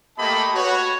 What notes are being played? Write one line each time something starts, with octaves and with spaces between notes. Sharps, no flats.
A3 A#3 G4 D#5 A5 B5
F#4 B4 C#5